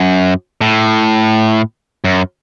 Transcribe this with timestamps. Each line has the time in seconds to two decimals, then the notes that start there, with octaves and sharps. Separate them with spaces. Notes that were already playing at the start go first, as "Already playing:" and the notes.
Already playing: F#2
0.61 A2
2.04 F#2